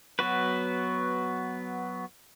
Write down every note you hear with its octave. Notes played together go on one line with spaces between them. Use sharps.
F#3 B3 F#4 B4